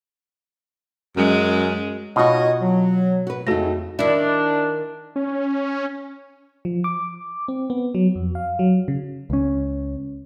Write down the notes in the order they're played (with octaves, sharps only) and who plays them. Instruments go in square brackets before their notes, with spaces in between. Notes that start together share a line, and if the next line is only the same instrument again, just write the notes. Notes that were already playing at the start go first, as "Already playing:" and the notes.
[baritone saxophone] F#2 [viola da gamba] G#3
[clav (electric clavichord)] B2 [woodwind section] D#4 C#5 D#5 [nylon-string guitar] F4 F#4
[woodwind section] F#3
[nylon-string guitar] F#4 B4
[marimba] F2 F#4 A#6 [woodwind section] C#3 C4 [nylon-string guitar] A3 D#4
[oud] D#3 E4 [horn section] D4
[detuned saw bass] C#4
[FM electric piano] F3
D6
C4
B3
F#3
F2
F5
F#3
C#3
[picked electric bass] C#2 C#4